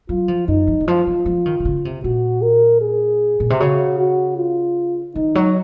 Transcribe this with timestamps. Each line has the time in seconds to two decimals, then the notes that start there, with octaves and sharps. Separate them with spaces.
0.09 F#3 F4
0.28 F3
0.48 F#2 D#4
0.67 F3
0.80 D#3
0.87 F3 F4
1.07 F3
1.26 F3
1.46 D#3
1.60 C3
1.65 C#3
1.85 C3
2.04 A#2 F#4
2.42 A#4
2.82 G#4
3.40 A#2
3.50 C3
3.59 C#3 F#4
3.99 F#4
4.37 F4
5.15 D#3 D#4
5.35 F#3